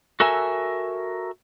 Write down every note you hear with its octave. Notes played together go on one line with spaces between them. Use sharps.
F#4 A4 A#4 E5 G#5